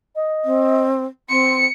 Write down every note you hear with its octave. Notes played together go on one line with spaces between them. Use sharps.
D#5
C4
C4 C6 C#7